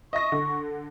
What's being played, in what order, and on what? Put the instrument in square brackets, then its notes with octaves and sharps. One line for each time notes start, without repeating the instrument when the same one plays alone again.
[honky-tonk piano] D#5 E5 A#6 [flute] C#6
[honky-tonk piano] D3